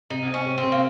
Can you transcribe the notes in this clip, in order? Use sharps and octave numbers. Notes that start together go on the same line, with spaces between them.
C3 D#4
C4
C#4
C3
C4
C3
A#3